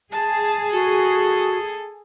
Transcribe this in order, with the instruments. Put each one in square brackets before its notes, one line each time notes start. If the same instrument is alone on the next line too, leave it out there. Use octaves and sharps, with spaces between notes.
[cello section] G#4 [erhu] A5
[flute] F#4 [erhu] A4